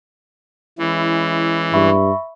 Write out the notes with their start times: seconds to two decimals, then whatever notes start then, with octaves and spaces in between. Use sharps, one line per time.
0.78 E3 G#3 C#4 E4
1.74 G2 E5 B5 C#6